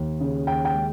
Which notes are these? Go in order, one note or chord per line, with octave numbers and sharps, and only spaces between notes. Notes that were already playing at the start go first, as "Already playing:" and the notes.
Already playing: D#2
C#3
D#2 G5
G5
G#3